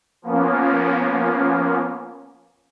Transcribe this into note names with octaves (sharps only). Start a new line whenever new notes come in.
F3 A#3 B3 C#4